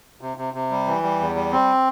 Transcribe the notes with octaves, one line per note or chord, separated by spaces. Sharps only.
C3
C3
C3
G3
E3
G3
E2
G3
C4